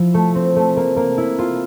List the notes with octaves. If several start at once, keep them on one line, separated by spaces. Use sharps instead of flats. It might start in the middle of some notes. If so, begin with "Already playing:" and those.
Already playing: F3 E4
A3
C4
A3
A#3
A#3
E4
F4